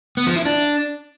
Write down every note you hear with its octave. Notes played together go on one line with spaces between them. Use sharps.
B3
F3
E4
D4